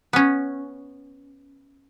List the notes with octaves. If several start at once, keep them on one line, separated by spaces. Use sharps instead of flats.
B3 C#4